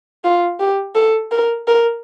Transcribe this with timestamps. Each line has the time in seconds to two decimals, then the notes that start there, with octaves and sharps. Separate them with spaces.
0.25 F4
0.60 G4
0.96 A4
1.31 A#4
1.68 A#4